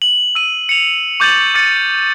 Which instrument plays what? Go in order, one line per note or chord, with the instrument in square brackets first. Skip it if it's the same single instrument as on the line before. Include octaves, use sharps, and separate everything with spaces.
[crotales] F#7
E6 D#7
C#7 F7
C#6 D6 G6 A6 F7 F#7
D6 F6 A6 C#7 D#7